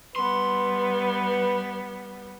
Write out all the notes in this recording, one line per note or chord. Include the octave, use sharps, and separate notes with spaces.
G3 B3 B4 C6